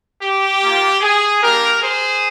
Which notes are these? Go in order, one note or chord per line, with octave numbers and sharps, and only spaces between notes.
G4
A#3 F4
G#4
G3 A#3 D4 G4 A#4
G#4 C5